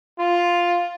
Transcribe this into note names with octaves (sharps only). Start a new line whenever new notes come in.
F4